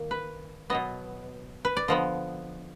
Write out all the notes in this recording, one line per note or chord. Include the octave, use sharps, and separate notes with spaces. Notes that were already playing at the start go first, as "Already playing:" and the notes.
Already playing: D#3 A#3
B4
B2 F#3 B3 D#5
B4
D5
D3 F3 B3 D#5